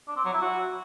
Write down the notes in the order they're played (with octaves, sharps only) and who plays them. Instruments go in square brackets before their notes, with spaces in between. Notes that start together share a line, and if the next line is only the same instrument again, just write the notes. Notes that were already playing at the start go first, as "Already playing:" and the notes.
[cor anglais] D4
C4
F#3
E4
F#4